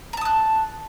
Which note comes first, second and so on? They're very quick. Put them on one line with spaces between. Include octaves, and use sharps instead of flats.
A#5 A5 D#6 F#6